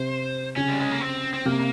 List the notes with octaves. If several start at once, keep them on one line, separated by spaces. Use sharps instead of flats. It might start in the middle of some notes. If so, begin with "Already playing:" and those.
Already playing: C3 C5
C#3 C#4
G3
G#3
A#3
C4
C4
C3 A#3